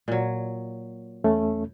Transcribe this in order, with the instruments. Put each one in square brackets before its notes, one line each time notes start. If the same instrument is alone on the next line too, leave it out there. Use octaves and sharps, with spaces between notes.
[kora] A#2 F#3
[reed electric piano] E2 A3 C#4